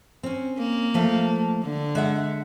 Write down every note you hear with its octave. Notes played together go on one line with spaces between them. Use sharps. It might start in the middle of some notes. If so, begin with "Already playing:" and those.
C4 C#4
A#3
F3 A3 F5
D3
G#3 E5 F#5